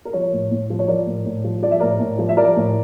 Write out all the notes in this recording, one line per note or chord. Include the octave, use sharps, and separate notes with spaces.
A#4
F3 C#5
A2
A2
F3
C#5
F3 A#4 D5
A2
A2
F3
F3 D5
E5
A2 A#4 D5
A2
F3
E5
F3 A#4 D5
A2